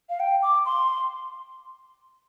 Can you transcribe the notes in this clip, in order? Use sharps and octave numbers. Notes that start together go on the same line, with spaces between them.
F5
G5
D6
C6